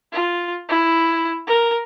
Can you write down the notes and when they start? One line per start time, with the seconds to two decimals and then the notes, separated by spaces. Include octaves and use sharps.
0.12 F4
0.69 E4
1.47 A#4